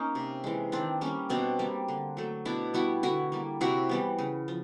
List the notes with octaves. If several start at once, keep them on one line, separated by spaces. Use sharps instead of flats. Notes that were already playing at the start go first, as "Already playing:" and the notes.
Already playing: A#3 C#4 D#4
C3
E3 G#3
D#3 C4 D4
G3 A#3 C#4
B2 C4 D4
G3 A#3
D3
F#3 A3
B2 D4 E4
G3 B3 E4 F#4
D3 E4 F#4
G3 A#3
C3 E4 F#4
E3 G3 B3
C#3
F3